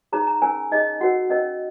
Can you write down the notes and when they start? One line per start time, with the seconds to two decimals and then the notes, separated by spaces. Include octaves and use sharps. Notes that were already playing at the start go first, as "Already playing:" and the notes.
0.12 D#4 G#4 C#5 A#5
0.27 A#5
0.42 C#4 A#4 C#5 G#5
0.72 D#4 G#4 C#5 D#5
1.01 F#4 A#4 C#5 F#5
1.30 C#4 A#4 C#5 D#5